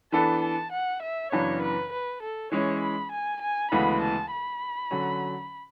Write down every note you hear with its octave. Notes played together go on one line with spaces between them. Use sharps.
E3 B3 D4 A4 A5
A5
F#5
E5
F#2 C#3 E3 B3 D4 C#5
B4
B4
A4
E3 G#3 C#4 E4 C#5
B5
G#5
G#5
D2 C#3 E3 G#3 B3 B5
A5
B5
D3 F#3 C#4